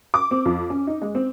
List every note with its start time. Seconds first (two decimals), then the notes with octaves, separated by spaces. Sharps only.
0.14 D6
0.31 C4
0.45 F2
0.70 C#4
0.87 D#4
1.02 G#3
1.15 C4